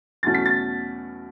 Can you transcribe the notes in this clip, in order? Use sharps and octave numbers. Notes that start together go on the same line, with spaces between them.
E2 B2 F#3 A3 C#4 A6
B6
A6